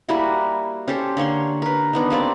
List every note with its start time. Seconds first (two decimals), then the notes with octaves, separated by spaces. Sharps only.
0.09 G3 A#3 E4 F#4
0.88 C#4 G4 A4 C5
1.17 D3 A#3 C#5 C6
1.62 A#4 B4
1.93 D#3 B3 D4
2.10 G3 A#3 C4 D5